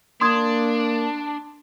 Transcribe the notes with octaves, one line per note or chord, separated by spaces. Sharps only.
A#3 D4 C6 D#6 G#6